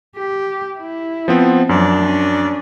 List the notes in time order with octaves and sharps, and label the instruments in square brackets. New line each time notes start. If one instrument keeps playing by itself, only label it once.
[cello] G4
E4
[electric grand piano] F3 B3 C4
[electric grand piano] F#2 [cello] F3 F#3 [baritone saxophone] D4
[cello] C#4